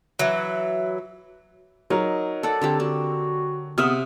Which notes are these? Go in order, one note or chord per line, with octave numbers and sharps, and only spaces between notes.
E3 F#3
F#3 D#4 A#4
A4 D5 F#5 A5
D3 C4 G4
D4 F#4
C3 B3 E5 F#5 D#6 F6